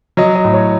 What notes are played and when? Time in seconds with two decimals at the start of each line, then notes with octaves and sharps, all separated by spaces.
0.17 F#3 D#5
0.35 D#5
0.45 A2
0.54 C#5